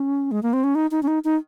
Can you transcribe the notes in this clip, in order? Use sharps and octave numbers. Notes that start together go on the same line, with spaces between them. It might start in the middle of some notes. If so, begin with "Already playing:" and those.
Already playing: C#4
G#3
A#3
C4
C#4
D#4
D#4
C#4
D#4
D#4